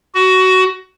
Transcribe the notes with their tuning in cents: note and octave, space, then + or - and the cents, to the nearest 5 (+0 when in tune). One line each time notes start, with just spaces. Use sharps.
F#4 +15